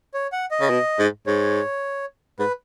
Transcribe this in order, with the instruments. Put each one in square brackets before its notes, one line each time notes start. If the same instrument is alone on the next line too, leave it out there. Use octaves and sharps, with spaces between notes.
[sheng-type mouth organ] C#5
F#5
D#5
[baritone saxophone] C#3
B2
G#2
[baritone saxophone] G#2 [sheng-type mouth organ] C#5
[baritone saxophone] G#2 [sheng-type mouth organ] B4